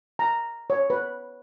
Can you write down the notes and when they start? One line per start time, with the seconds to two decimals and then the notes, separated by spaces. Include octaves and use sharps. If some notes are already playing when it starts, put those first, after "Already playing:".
0.19 A#5
0.70 C#5
0.90 B4